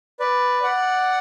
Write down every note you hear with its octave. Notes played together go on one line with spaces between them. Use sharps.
B4 D5
D5 F#5